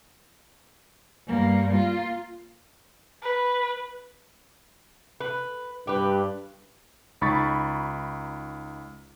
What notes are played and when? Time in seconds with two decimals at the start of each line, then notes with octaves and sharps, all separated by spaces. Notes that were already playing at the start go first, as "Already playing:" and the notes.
1.26 G2 A#3
1.70 A#3 F4
3.23 B4
5.21 B4
5.87 G2 G4 B4
7.21 C#2 D#4 B5 C#6 A6